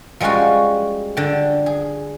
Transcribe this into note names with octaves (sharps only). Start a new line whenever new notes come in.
F3 G3 G#3 C#4 F4 F#4
D3 G5
G#4